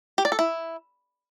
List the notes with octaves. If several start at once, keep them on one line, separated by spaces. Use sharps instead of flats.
G4
D5
A4
E4